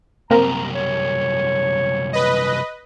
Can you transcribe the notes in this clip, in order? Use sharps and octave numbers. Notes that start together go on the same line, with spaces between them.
C2 F#2 A#3 C4 A#4 A#5
C#5
B4 D#5